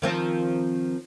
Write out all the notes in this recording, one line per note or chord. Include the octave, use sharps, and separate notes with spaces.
D#3 F3 C4